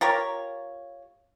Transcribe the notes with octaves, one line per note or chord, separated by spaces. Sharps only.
F4 G4 A#4 C#5